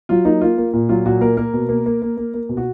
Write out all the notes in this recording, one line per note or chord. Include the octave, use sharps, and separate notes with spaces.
F#3 F4
A#3 D#4
A#3 F4
A#3
A#2
F#3 F4
A#2 F#4
A#3 A#4
A#3 A#4
B2
A#3
A#3
A#3
A#3
A#3
B2
F#4